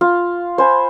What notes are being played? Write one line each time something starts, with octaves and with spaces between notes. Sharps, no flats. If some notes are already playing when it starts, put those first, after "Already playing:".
F4 F5
C5 G#5 B5